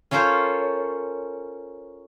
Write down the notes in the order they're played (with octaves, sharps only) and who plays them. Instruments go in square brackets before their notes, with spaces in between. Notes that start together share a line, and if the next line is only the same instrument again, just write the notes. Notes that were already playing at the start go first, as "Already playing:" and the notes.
[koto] C#4 F4 A4 A#4 C5 C#5